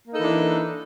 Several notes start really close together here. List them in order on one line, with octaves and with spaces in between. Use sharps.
A#3 D#4 A4 E3 D4